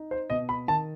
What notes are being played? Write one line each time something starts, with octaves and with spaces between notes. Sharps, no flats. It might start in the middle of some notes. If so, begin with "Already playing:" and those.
Already playing: D#4
C5
B2 D#5
B5
D#3 A5